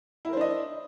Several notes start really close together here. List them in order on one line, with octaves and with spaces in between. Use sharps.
E4 A#4 C5 D4 D#5